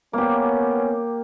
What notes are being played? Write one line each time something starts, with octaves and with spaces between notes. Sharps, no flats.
A#3 B3 C#4 G4